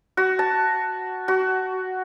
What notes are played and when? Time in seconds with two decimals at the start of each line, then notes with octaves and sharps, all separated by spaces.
0.17 F#4
0.39 A5
1.28 F#4